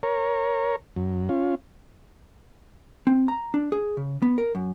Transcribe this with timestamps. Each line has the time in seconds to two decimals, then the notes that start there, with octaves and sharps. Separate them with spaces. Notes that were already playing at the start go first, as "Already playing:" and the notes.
0.03 A#4 C#5
0.96 F#2
1.29 C#4 F4
3.07 C4
3.28 A#5
3.54 D4
3.72 G#4
3.97 C#3
4.22 B3
4.38 A#4
4.55 F#2